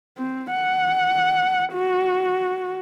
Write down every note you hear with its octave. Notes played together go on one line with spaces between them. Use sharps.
C4
F#5
F#4